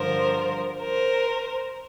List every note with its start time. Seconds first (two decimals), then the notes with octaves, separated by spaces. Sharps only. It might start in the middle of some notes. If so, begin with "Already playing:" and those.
Already playing: G2 D3 F3 A#4 C5
0.81 A#4 C5